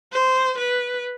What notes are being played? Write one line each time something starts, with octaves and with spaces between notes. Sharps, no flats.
C5
B4